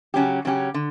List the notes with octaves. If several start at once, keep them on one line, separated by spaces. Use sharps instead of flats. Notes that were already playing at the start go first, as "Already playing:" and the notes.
C#3 F#3 C#4 G4
C#3 F#3 C#4 G4
D3